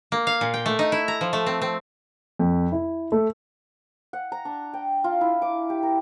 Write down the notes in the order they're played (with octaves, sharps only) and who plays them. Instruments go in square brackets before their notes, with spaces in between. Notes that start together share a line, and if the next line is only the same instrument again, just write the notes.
[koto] A#3
F5
A#2
G5
A3
D#4
E4
A#5
F3
A3
C4
C4
[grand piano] F2
E4
A3
[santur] F#5
A#5
D4
G5
F4
E4
D6
G4
A#4